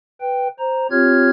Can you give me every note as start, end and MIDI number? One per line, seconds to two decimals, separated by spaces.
0.21 0.48 71
0.21 0.48 79
0.59 0.87 72
0.59 0.87 82
0.91 1.30 60
0.91 1.30 65
0.91 1.30 67
0.91 1.30 73
0.91 1.30 89
0.91 1.30 92